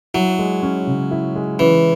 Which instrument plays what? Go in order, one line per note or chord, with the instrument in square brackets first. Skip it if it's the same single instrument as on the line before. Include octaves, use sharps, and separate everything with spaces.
[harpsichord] F#3 [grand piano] E4
[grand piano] G#3
C#4
C#3
E4
G#3
[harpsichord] E3 [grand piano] C#4